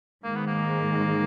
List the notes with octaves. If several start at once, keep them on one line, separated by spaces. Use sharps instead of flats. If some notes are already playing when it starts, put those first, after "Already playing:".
G#2 D#3 G#3 A#3
B3
A#3